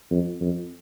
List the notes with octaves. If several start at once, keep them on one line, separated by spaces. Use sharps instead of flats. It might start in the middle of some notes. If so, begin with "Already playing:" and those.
F2
F2